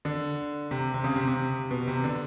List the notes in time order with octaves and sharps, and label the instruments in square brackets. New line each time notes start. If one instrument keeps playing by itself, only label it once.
[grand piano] D3
C3
C3
C#3
C3
C3
B2
C3
D3